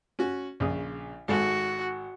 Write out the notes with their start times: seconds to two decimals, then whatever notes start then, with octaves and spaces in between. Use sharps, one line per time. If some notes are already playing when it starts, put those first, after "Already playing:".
0.19 C#4 F#4
0.60 A#1 C#3 D#6
1.28 G#1 G#2 F#4 A4